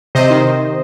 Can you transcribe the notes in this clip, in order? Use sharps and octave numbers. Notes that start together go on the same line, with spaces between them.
C3 C5 D#5
D#3